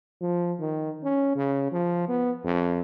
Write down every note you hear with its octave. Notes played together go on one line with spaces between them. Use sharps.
F3
D#3
C#4
C#3
F3
B3
F2